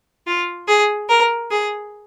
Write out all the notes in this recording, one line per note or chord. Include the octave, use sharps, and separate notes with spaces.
F4
G#4
A#4
G#4